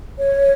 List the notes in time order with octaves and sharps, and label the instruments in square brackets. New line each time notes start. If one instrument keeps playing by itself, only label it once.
[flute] C#5